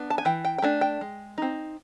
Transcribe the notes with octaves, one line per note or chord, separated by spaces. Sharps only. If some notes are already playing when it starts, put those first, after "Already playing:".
Already playing: B3 D4
A5
G#5
E3 G5
G5
G5
A3 D4 G#5
G5
G#3
C4 D#4